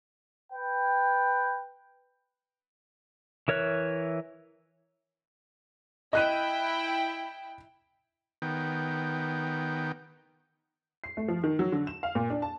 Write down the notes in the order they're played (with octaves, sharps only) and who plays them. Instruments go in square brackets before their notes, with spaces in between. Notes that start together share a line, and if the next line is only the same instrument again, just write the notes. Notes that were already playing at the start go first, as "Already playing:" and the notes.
[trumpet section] B4 G5
[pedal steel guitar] E3 A#4 C#5 E5 F#6
[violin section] E4 G5 [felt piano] D#5 F#6 D#7
[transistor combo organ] D#3 B3 G5
[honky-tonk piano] C7
A3
F3
D#3
F#3
D3
E7
F5
A#2
D4
A5